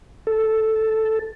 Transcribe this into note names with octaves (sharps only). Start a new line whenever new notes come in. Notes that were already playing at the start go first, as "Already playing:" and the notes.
A4